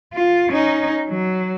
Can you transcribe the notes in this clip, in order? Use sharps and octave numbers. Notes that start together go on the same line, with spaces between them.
F4
C#4 D#4
F#3